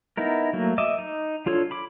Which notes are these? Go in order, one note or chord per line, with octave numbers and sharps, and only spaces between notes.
B3 D#4 E4 A#4
F#3 A3 A#3
D#5 E5 D6
D#4
D4 F4 A4 C#5
B5 D6